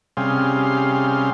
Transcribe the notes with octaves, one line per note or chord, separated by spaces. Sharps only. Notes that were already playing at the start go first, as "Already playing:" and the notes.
C3 G3 C#4 G#4 F5 C6